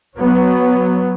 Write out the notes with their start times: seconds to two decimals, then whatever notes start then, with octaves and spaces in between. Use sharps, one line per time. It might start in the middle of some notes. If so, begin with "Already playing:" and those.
0.17 F#3 B3